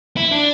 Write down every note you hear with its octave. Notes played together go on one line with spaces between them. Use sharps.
E4
D4